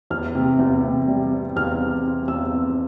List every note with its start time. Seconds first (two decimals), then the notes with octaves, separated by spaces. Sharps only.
0.10 E2 F6
0.35 C3
0.59 E2
0.83 C3
1.07 G3
1.32 C4
1.56 E2 F6
1.81 C4
2.05 C4
2.28 E2 E6
2.53 C4